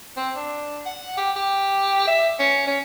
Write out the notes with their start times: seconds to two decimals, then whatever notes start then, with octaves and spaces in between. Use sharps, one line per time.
0.17 C4
0.36 D4
0.86 F#5
1.17 G4
1.36 G4
2.07 E5
2.39 C#4
2.67 C#4